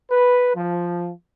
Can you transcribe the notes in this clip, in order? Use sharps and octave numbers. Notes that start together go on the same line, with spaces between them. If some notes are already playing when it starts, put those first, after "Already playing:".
B4
F3